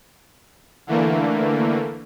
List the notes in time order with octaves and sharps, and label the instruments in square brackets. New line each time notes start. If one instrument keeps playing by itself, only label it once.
[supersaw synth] D3 E3 A3 A#3